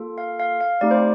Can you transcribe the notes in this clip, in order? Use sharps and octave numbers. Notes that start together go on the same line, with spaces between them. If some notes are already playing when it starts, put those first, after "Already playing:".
Already playing: A#3 F4 A4
F5
F5
F5
A3 C4 D#4 G4 D5
C5